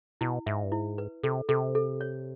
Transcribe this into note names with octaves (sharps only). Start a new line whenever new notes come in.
B2 E4
G#2 E5
G2
G#2 E4
B4
C3 A4
C3 A4
A4
C#5